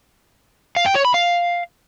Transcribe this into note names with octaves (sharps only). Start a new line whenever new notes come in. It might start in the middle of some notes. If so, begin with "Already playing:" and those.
F5
G5
C#5
B5
F5